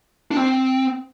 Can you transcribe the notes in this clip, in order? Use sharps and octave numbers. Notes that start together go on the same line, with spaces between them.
D4
C4